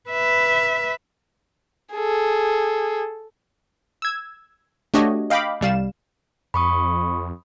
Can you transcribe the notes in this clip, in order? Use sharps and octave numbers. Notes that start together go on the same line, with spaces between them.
B4 E5
G#4 A4
E6 G#6
A3 D4 F#4 G4 C#5 D#5
D#5 F5 G5 B5 D6
C2 G3 F5 E7
F2 B5 C#6 D#6